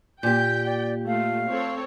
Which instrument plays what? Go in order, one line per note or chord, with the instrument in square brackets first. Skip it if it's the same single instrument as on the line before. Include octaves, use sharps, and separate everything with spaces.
[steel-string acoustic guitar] A#2 G4 [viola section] G5 [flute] G6
[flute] D5
[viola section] A3 F4 [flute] F5
[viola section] C4 A4 C#5